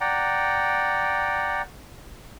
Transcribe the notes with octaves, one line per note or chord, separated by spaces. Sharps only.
D5 F#5 G5 A#5